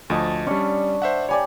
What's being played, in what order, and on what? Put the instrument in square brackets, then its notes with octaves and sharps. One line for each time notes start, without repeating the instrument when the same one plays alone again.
[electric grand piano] D2 F3 [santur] C#5 D#5 A5
[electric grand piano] G3 C#4 [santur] D4 C#6
[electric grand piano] C5 E5 F#5
[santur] G3 G4 D5 [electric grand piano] C#5 G#5